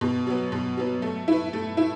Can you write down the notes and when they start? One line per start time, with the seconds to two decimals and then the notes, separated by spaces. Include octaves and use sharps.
0.01 B2
0.27 F#3 B3
0.52 B2
0.77 F#3 B3
1.02 A3
1.28 E4 B4
1.53 A3
1.77 E4